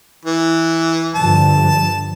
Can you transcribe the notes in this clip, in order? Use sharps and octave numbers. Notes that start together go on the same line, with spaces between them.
E3
G2 D3 F3 A5